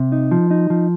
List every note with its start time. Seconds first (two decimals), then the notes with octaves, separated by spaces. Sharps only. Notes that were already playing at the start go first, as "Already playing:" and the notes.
Already playing: C3
0.12 D#4
0.31 F3
0.51 D#4
0.70 F3